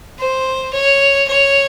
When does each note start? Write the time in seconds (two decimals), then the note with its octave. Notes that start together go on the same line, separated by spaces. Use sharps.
0.19 C5
0.73 C#5
1.28 C#5